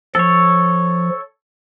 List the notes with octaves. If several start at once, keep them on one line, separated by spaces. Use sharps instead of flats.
F3 A4 C#5